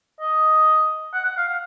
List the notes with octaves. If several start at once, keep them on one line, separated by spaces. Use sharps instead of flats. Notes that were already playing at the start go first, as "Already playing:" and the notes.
D#5
F#5
F#5
F5
F5